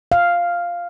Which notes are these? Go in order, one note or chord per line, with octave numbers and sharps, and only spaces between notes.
F5